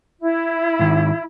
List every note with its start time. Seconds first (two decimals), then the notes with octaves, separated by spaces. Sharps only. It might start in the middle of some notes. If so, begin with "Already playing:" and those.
0.22 E4
0.79 G#2 D#3